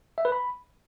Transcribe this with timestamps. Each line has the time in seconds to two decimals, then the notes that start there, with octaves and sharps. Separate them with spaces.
0.18 E5
0.25 B4
0.32 B5